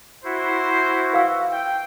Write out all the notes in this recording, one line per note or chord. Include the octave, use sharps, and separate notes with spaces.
E4 F#4 C5
B4 F5 E6
G5